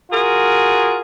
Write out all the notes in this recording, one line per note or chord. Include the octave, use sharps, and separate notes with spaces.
F4 F#4 G#4 A#4